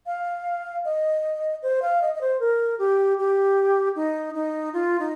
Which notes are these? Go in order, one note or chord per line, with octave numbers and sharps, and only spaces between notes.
F5
D#5
C5
F5
D#5
D#5
C5
A#4
G4
G4
D#4
D#4
F4
D#4